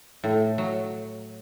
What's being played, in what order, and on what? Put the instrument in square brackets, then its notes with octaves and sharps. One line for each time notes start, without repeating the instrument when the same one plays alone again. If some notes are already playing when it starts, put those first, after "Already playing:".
[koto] A2
F#3